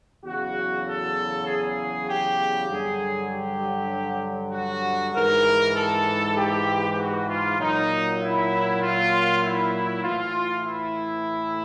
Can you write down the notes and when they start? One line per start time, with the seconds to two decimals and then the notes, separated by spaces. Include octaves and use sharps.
0.25 E2 C#3 F#3 F#4
0.86 A4
1.47 G#4
2.08 G4
2.69 G2 D3 F#3 G#4
3.30 G4
4.52 F#4
5.14 G#2 E3 A#4
5.75 A4
6.36 G4
6.97 F#4
7.28 F4
7.58 A#2 F#3 D#4
8.20 E4
8.81 F4
9.42 E4
10.02 A2 E3 F4
10.64 E4